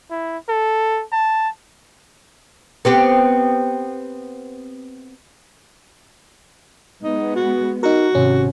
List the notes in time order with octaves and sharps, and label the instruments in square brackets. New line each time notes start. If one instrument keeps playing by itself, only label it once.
[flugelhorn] E4
A4
A5
[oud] B3 C4 G4
[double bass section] G#3 B3 [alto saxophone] D#4
[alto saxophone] F#4
[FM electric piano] D#4 A#4 [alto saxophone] F#4
[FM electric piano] G#1 C#4 [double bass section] C3